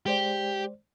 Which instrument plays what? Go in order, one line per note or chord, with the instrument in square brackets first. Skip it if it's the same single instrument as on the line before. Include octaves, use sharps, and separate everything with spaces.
[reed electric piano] G#3 C5 D5 [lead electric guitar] G4